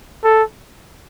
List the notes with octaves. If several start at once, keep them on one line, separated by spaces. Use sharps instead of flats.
A4